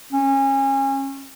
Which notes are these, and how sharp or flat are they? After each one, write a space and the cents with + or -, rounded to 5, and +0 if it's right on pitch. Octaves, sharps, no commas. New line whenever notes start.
C#4 -25